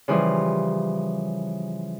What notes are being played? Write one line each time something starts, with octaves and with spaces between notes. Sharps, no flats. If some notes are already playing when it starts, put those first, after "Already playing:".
C#3 E3 F3 G3